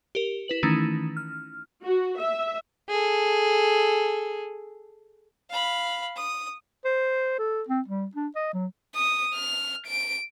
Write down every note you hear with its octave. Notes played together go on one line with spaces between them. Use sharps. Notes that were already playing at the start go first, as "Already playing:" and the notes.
G4 A#4
E4 B4 F#7
D#3 E3 A3 C#4 D#4 E4
F6
F#4
E5
G#4 A4
F5 B5
D#6
C5
A4
C4
G3
D4
D#5
F#3
D#6
F6
D7